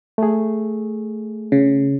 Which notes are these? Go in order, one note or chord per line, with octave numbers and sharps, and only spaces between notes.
A3 G#4
C#3